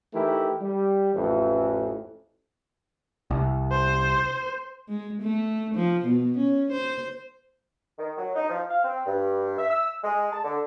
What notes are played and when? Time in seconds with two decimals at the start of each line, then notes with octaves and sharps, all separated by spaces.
0.14 E3 A3 D#4 E4 G4 A#4
0.61 G3
1.15 A1 F2 E3
3.31 C2
3.71 C5
4.89 G#3
5.22 A3
5.74 F3
6.05 B2
6.38 C#4
6.72 C5
7.99 D#3
8.18 F#3
8.36 D#4
8.50 F3
8.70 F5
8.84 C4
9.06 G2
9.59 E5
9.71 E6
10.04 G#3
10.32 A5
10.44 D3